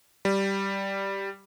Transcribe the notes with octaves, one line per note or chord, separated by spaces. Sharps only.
G3